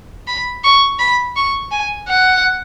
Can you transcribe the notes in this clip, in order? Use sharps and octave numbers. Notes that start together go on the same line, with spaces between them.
B5
C#6
B5
C#6
G#5
F#5